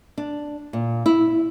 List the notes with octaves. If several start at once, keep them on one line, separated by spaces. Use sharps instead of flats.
D4
A#2
E4